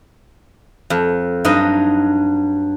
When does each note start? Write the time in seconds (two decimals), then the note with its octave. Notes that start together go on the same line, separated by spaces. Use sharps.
0.90 F2
1.45 G2 F#3 D#4 D#5